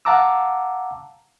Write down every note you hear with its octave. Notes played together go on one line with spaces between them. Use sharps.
F5 F#5 A5 A#5 D6 E6